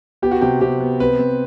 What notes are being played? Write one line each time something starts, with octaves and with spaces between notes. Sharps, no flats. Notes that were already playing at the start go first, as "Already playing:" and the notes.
B3 G4
F#4
C3 G4
C3 G4
B3
C4 B4
C4